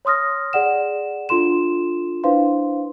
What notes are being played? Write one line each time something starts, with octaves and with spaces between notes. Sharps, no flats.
C#5 C6 D#6 F6 A#6
G#4 D5 F#5 E7
D4 F4 A4 C6 E7
D4 E4 B4 C5 F5 C6